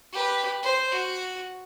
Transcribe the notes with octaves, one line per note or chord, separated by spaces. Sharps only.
G4 B4
C5
F#4